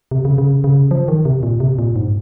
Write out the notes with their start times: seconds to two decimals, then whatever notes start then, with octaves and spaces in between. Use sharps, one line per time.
0.11 C3
0.25 C#3
0.38 C#3
0.64 C#3
0.91 F3
1.08 D#3
1.25 C3
1.43 A#2
1.60 C3
1.79 A#2
1.96 G#2